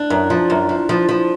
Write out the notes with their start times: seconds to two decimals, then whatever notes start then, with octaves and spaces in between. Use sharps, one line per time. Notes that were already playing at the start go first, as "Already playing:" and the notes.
Already playing: D4
0.10 F#2
0.30 F3
0.50 F#2
0.69 F3
0.89 F3
1.09 F3